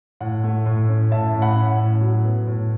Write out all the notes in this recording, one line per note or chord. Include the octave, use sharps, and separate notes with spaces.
A2 F#5
A3
A2
C#4
A2 E5 A5
A2
F#5 B5
C#4
A2
F#3
B3
A2